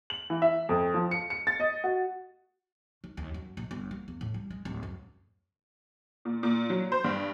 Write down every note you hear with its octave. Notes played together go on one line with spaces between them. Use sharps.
F#7
E3
E5
F2
F3
C#7
C#7
A6
D#5
F#4
D#3
D#2
F#2
A#1
G1
A#3
E2
A2
G3
G#3
D1
F#2
A#2
A#2
F#3
C5
G2